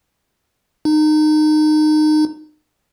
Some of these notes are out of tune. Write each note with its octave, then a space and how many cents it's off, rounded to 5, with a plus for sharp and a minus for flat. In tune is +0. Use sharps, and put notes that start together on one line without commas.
D#4 -25